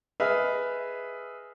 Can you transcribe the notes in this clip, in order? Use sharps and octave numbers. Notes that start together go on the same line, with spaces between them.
G#4 B4 D#5 E5 F6